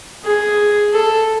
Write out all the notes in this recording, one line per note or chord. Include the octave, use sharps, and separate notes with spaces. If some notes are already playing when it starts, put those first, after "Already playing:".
G#4
A4